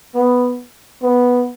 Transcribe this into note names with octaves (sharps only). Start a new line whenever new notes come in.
B3
B3